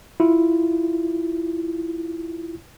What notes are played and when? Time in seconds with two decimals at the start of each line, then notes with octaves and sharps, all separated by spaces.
0.20 E4 F4